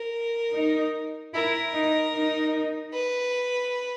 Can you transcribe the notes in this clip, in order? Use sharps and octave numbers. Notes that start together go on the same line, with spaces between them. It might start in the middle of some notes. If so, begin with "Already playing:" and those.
Already playing: A#4
D#4
E4 A#4
D#4
D#4
B4